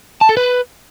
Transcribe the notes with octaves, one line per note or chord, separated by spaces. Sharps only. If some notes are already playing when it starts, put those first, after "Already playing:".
A5
A4
B4